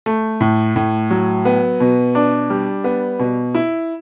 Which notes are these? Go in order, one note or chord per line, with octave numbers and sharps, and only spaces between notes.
A3
A2
A2
F#3
B3
B2
D4
G3
B3
B2
E4